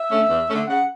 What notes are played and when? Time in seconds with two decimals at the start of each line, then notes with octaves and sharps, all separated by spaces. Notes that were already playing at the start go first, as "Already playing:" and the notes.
Already playing: E5
0.10 D3 A3 C#4
0.29 E2
0.48 D3 A3 C#4
0.67 C#3 F#5